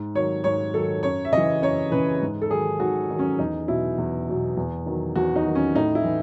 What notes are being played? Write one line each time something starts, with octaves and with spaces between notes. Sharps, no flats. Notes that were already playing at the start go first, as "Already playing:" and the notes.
Already playing: G#2
D#3 F#3 C#5
G#2 C#5
D#3 F#3 A4
F#2 C#5
E5
C#3 E3 D#5
F#2 C#5
C#3 E3 B4
G#2
A4
D#3 F#3 G#4
G#2 F#4
D#3 F#3
C#4
E2 D#4
B2 F#3 E4
E2
B2 F#3
E2
D#3 F#3
E2 F#4
D#4
D#3 F#3
C#4
A2 D#4
E4
E3